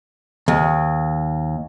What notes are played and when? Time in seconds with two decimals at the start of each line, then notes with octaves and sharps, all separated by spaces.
0.48 D#2